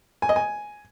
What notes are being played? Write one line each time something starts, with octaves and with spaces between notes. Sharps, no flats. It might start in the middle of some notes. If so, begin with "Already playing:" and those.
G#5
D#5
G#5